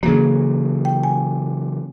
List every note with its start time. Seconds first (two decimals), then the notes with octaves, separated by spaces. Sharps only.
0.03 C#3 E3 F#3 A#3 G#4
0.85 G5
1.04 G#5